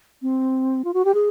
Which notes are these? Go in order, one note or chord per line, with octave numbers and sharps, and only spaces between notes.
C4
F4
F#4
G4
G#4